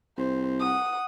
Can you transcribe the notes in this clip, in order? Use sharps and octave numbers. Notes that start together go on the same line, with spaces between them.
C2 C5
F#5 D#6